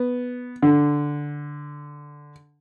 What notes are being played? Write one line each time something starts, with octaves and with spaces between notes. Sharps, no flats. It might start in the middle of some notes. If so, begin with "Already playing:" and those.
Already playing: B3
D3